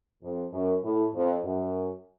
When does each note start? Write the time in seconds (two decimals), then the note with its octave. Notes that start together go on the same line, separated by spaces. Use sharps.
0.23 F2
0.53 F#2
0.84 A2
1.15 F2
1.45 F#2